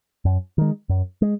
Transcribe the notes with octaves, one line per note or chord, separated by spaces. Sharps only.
F#2
D#3 G#3
F#2
G#3